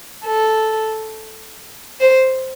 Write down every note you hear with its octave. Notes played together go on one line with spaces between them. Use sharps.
A4
C5